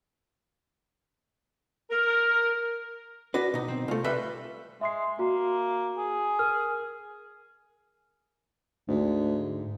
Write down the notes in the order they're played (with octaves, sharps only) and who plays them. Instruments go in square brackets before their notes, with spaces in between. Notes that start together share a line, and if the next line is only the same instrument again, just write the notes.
[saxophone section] A#4
[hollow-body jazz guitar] D4 F#4 B4 [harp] A#6
[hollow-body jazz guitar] B2 D#4
[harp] C4
[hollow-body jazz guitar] C2 A3 [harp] F4
[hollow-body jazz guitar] G3 A4 E5 [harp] B4
[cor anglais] G#3 [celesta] E5 C6 C7
[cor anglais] A#3 [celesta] F#4
[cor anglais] G#4
[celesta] A#4 F6
[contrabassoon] D2 [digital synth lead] G#2